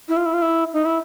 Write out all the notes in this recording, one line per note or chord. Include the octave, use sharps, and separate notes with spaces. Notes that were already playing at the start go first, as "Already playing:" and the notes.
E4
F4
E4
F4
E4
D#4
E4